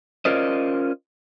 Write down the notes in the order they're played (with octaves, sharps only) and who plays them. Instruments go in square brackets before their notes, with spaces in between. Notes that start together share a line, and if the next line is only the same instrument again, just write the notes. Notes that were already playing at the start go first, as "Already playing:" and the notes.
[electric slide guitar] C#4 F4 A#4 C5 D5 D#5